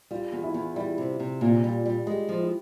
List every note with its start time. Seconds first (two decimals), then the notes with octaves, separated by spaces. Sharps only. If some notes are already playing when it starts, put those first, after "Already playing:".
0.11 G3 F4
0.32 E2
0.44 E4
0.54 E2
0.76 G3 E4
0.98 C3
1.20 C3
1.41 A#2 F4
1.64 G3
1.86 G3
2.07 G#3 G4
2.29 F3
2.40 E4